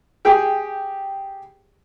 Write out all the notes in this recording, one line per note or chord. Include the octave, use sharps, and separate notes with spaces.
G4 G#4 G5